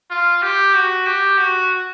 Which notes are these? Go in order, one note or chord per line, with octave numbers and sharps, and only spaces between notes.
F4
G4
F#4
G4
F#4